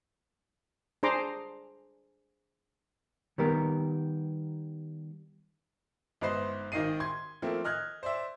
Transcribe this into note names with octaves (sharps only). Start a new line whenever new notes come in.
D4 G#4 C5 A#5 C6 D6
D#3 G3 B3 G4 A#4
G1 G#2 D#4 B4 C5 C7
G#1 D#3 D#4 D#5 C7 D#7
C6 G#6
F3 A3 A#3 C4
D#5 F6 F#6 G#6
C5 D5 E5